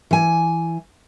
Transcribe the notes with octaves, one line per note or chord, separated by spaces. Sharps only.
E3 G#5